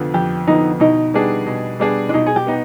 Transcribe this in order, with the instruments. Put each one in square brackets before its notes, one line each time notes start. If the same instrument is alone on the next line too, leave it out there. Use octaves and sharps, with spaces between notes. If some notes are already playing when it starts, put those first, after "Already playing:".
Already playing: [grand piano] F2 D3 F3 B3
[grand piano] F2 [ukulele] G4
[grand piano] D3 F3 B3 [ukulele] D#4
[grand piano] B2 [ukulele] D#4
[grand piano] G3 B3 D4 G#4
B2
G3 B3 D4 G#4
[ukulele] D4
[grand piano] B2 [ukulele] D#4
[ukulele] G#4
G4
[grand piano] B3 D#4